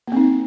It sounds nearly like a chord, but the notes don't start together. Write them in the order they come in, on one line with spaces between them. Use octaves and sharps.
A#3 C4 D#4